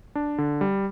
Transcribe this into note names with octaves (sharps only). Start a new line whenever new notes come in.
D4
D3
G3